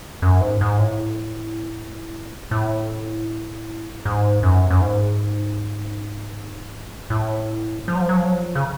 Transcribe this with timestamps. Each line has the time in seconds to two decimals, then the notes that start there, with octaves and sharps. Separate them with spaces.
0.22 F#2
0.41 G#2
0.61 G#2
0.79 A2
2.51 A2
4.05 G#2
4.43 F#2
4.70 F#2
4.81 G#2
7.10 A2
7.88 F3
7.95 F#3
8.02 F3
8.09 F#3
8.17 F3
8.24 F#3
8.32 F3
8.55 C#3